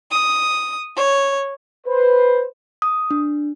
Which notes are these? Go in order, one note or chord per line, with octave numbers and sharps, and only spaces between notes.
D#6
C#5
B4 C5
D#6
D4